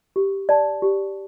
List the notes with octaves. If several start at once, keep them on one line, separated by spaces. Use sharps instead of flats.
G4
D5 A5
G4